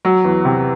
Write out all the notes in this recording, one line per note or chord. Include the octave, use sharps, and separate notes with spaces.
F#3
E2
C3